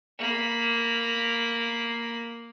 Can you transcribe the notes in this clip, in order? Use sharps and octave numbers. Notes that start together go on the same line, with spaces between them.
A#3 B5